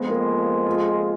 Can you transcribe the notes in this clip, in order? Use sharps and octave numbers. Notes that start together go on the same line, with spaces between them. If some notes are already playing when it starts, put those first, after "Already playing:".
Already playing: F2 F3 G#3 B3
A#3
F4